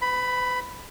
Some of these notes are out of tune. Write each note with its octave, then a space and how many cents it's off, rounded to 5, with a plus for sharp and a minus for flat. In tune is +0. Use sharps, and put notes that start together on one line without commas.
B4 +40 B5 +5